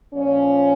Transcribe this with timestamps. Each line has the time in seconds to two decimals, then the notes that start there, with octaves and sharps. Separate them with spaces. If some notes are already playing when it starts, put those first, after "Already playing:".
0.13 A#2 F3 C#4